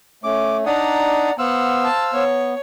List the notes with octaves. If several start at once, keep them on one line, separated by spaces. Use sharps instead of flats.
A3 C#4 D6
D4 D#4 D5 F#5 A#5 D#6
B3 C5 F5 F#5 E6
A5
B3 C#5